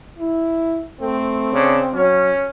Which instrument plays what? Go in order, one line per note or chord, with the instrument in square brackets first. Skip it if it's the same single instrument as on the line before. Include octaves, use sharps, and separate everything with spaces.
[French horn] E4
[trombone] A3 [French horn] C4
[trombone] C#3 [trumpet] D4
[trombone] F#3 [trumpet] C#4